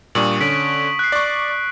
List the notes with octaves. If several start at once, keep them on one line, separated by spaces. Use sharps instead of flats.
A#2 G3 D4 C#6 D#6 F#7
D3 C#4 B6 D7 F#7
F#6 C7
D5 C#6